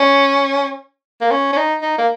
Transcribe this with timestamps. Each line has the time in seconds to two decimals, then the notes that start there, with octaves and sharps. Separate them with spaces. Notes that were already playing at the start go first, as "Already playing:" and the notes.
Already playing: C#4
1.21 A#3
1.31 C#4
1.53 C#4
1.57 D#4
1.82 D#4
1.98 A#3